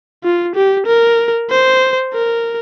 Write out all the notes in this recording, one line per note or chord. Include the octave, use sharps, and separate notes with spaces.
F4
G4
A#4
C5
A#4